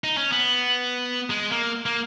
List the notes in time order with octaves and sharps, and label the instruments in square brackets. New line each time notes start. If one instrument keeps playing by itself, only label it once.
[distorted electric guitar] D#4
C#4
B3
G#3
A#3
A#3